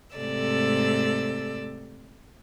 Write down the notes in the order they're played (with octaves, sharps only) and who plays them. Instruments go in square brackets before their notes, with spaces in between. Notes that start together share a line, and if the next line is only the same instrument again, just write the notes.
[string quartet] G#2 C3 A3 A4 D5 E6